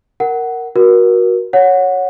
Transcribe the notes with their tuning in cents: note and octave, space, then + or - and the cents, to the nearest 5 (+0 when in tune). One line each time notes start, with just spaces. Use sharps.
A#4 -5 F#5 +10
F#4 +0 A#4 +30
C#5 +0 F#5 -15